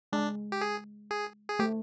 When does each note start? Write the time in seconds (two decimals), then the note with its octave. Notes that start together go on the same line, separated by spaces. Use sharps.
0.13 G#3 D4
0.52 G4
0.61 G#4
1.11 G#4
1.49 G#4
1.59 A3 G4